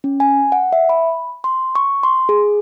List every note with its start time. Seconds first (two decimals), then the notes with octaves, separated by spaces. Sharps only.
0.04 C#4
0.20 G#5
0.52 F#5
0.72 E5
0.89 B5
1.44 C6
1.75 C#6
2.03 C6
2.29 G#4